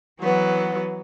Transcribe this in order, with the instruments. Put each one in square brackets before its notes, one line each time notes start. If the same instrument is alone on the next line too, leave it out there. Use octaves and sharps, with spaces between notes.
[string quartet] E3 F#3 B3